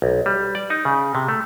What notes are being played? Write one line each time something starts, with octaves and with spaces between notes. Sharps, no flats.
B1
G3
D5
D#4
C#3
C3
A3